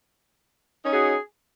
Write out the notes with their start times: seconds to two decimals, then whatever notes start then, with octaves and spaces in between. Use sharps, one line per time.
0.82 C#4
0.85 D#4
0.89 G#4
0.92 F#4